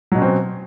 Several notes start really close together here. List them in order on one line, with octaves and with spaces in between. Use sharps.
F#3 B2 C#4 C4